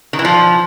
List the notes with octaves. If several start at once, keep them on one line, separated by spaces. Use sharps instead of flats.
D#3
E3
F3